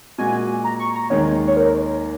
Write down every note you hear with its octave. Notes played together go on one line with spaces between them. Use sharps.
A#2 G#3 F#4 G#5
A#5
C#6
A#5
D#2 D#3 G#3 C#5
C#5
A#4